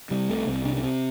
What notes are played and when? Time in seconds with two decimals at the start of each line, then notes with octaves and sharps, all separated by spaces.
0.11 C3 G3
0.29 C2 A3
0.47 C2 C4
0.65 C3 D4
0.76 D4
0.83 C3 C4